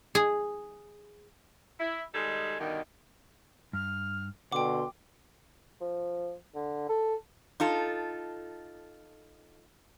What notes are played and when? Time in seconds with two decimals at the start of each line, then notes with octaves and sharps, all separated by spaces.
0.15 G#4
1.80 E4
2.15 D#3 G3 G#3 D#4 G#4 A4
2.60 G2 B2 D3 D#3
3.73 G2 F6
4.52 B2 D3 F#5 G5 C6 D6
5.81 F3
6.55 D3
6.89 A4
7.60 D#4 F4 A4